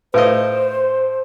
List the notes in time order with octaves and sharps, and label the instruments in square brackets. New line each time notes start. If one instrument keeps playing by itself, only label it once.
[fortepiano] A2 F4 D#5 [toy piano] B4 [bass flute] C5